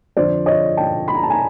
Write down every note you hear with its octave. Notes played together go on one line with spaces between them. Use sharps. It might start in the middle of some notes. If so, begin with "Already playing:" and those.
F2 D3 F3 C5 D5
C#5 D#5
G5 A5
B5
A#5
A5
G#5 A#5